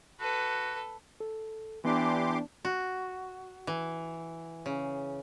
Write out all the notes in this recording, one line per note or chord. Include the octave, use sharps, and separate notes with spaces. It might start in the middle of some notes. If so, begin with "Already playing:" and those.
F#4 A4 B4
A4
E3 B3 D4 G4 C6 D6
F#4
E3
C#3